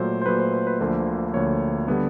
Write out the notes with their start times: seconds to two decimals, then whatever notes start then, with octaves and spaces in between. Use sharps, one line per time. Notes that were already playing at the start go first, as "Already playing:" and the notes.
Already playing: A#2 F#3 A3 C5
0.22 C5
0.26 A#2 F#3 A3 B4
0.40 C5
0.54 C5
0.67 B4
0.80 D2 D3 F3 A#3 C5
1.34 D2 D3 F3 A#3 C#5
1.87 D3 G3 B3 D4